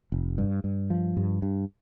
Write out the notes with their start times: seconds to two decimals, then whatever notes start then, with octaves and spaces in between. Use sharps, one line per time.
0.12 F1
0.38 G2
0.64 G2
0.90 F3
1.17 G2
1.42 G2